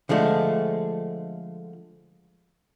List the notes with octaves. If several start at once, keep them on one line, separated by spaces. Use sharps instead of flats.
D3 F3 G#3 A3